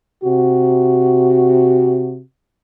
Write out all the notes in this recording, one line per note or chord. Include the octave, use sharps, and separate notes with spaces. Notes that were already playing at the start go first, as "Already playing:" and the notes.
C3 F#4